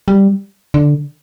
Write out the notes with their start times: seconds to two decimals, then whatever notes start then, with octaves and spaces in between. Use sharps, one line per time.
0.08 G3
0.74 D3